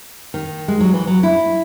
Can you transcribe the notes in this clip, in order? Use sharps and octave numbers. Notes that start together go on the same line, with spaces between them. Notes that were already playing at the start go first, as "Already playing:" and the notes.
D#3
G#3
F#3
E3
F#3
E4